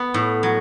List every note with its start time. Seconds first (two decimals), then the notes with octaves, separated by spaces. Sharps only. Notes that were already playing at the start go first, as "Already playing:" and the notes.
Already playing: B3
0.14 A2
0.43 F#3